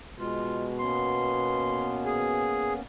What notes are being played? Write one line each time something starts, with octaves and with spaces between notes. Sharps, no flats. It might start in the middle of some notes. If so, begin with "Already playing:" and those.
B2 G#3 F4
A#3 B3 C#4 C6
G#4